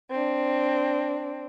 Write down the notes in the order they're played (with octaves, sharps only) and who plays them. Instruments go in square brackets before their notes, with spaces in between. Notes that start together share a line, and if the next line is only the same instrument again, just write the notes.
[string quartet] C4 D4